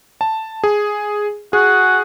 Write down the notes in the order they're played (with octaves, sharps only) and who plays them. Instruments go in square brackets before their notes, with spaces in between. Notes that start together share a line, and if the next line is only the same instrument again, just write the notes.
[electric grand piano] A5
G#4
[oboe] F#4 [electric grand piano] G#4